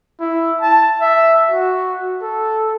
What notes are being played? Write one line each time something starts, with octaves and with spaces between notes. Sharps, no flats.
E4
A5
E5
F#4
A4